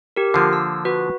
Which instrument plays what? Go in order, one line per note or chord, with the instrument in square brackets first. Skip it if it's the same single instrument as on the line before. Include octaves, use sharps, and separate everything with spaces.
[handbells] G4 A#4
[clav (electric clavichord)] D3 F3 A#3 [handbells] C7
[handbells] E6
F#4 B4